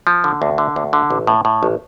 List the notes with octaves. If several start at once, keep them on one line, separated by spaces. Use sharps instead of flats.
F3
D3
D2
D3
D2
D3
A1
A2
A2
A1